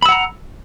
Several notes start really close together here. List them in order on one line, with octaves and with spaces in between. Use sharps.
B5 E6 F#5 A#5